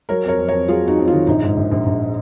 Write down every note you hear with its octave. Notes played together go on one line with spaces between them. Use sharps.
F#3 A#4 C#5
F2 A#4 C#5
F2
F2 A#4 C#5
F#3 F4 G#4
F2 D#4 F#4
F2
F4
D#3
A#1 D#4
G#2
A#1
A#1
A#1